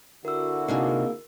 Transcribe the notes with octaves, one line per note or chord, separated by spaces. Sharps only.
D3 E4 F#4 A#4 E6
C3 A#3 D4 D#4 G#4 A#4 E6